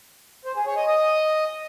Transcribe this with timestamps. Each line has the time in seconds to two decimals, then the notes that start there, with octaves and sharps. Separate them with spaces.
0.45 C5
0.56 G#4
0.66 C#5
0.77 D#5
0.87 D#5